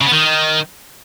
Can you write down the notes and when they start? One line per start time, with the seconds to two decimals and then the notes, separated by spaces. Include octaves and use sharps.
0.01 C#3
0.06 B3
0.12 D#3